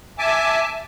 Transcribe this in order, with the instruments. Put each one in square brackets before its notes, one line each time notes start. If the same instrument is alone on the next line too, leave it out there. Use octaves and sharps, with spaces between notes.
[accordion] E5 G#5 A5 D6